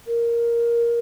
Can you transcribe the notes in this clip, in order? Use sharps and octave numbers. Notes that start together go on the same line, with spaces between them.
A#4